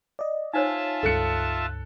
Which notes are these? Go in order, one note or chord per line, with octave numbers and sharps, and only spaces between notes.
D5 D#5
D#4 F4 C5 C#5 E5 G#5 A5
C#2 G2 A4 F#6 C#7